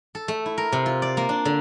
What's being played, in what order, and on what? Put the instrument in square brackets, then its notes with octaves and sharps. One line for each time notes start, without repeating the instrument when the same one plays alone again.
[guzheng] A4
A3
E4
A#4
C3
F4
D5
A#3
D4
D3